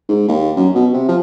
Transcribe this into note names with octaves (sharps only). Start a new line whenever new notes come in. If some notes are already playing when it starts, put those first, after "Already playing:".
G#2
D#2
F#2
B2
C3
F3